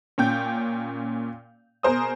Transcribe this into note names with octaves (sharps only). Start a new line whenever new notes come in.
A#2 C#4 G5 G6
B2 G#4 A#4 C5 D#6